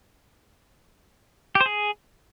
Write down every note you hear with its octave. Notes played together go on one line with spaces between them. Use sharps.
G4
C5
G#4